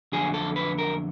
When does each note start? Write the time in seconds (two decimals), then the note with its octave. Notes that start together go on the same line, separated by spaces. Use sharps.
0.12 F2 D3 F#3 A3 G#4
0.34 A4
0.56 B4
0.78 A#4